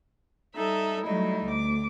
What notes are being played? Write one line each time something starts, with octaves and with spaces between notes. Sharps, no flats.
G3 D#4 A4 E5
F#3 G3 A3 D#4 E4
D2 D6